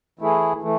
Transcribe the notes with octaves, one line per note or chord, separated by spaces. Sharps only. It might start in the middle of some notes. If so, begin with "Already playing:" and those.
E3 A3 E4 G#4
E3 A3